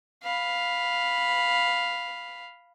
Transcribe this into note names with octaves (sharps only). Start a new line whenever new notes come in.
F5 B5